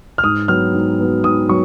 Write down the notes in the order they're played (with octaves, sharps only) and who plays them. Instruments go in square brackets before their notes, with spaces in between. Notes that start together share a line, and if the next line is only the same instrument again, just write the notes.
[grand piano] F6
G#2 D#6
F#3 B3 F6
G#2
F#3 B3
G#2 D#6
F#3 B3 C#6